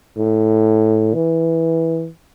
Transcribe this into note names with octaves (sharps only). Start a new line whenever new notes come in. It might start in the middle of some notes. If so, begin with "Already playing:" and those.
A2
E3